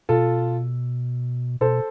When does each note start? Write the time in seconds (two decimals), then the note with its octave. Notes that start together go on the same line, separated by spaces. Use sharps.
0.09 B2 F4 A4
1.60 B2 A4 C5